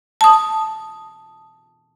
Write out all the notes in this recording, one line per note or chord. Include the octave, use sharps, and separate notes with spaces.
A5 D#6